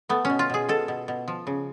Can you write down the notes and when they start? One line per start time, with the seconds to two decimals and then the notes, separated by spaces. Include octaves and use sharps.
0.09 A3 B3
0.25 B2 C#4
0.39 F4
0.50 B2 G#4
0.69 B2 A4
0.88 B2
1.08 B2
1.28 F3
1.47 C#3